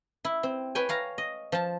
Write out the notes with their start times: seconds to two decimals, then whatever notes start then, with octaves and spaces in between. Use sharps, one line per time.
0.25 E4
0.43 C4
0.75 B4 C#5 G5 G#5
0.89 C#5 F5 A#5
1.18 D#5
1.52 F3 A5